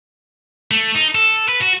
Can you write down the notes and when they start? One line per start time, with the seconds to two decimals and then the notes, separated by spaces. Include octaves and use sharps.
0.71 A3
0.95 D#4
1.15 A4
1.48 B4
1.61 F#4